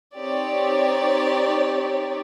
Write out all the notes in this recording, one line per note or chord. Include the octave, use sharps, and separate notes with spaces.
C4 D#4 G4 C#5 D5